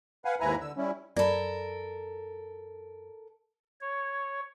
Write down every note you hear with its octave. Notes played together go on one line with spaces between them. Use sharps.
B4 F5 F#5 G#5
D#2 G#2 E4 B4 G#5 A#5
D3 E6
G3 C#4 E4
F#2 A4 A#4 D5 B5
C#5